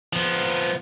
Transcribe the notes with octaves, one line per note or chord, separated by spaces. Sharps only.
F3 B3